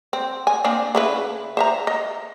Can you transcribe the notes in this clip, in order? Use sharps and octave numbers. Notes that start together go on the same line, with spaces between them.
C4
G#5
A#3 C4 D4
C#3 E4 B4
C5 E5 A#5
D#5